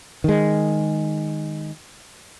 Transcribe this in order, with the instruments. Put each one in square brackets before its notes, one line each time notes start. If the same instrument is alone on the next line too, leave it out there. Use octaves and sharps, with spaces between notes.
[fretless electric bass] D#3 G#3